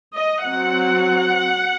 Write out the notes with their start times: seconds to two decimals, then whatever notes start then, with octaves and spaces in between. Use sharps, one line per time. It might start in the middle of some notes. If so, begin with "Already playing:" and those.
0.14 D#5
0.44 F#3 C4 F#5